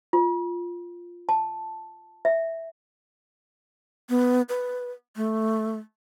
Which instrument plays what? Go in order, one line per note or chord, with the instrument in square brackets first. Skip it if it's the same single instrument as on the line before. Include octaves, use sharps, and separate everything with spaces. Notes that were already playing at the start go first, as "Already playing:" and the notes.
[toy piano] F4
A5
E5
[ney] B3
B4
A3